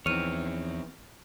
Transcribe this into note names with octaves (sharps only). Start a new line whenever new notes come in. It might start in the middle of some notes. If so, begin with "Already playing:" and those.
E2 E3 F3 C4 D#4 C#5 F6 D#7